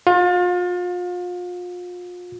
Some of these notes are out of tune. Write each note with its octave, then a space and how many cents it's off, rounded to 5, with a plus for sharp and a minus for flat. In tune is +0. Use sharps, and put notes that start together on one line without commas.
F4 +35